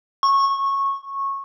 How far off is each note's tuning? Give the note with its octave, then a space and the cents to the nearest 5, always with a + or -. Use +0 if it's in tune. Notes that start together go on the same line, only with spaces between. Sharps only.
C#6 -15